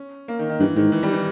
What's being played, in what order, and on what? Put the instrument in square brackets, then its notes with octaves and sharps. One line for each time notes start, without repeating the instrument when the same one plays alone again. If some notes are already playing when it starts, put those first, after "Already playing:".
Already playing: [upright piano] C#4
A#3
D#3
D#3
[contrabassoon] G2 [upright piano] E3
[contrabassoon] G#2 [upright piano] D#3
[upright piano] E3
G3
E3